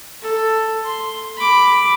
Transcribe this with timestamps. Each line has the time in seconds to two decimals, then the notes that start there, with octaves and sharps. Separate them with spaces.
0.22 A4
0.85 C6
1.37 B5 D6